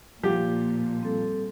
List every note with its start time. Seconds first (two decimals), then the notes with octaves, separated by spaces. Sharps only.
0.23 A#2 F3 G4
1.01 G3 C4 A4